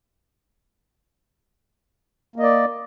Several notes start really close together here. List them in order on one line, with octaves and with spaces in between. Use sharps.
A#3 D#5 D5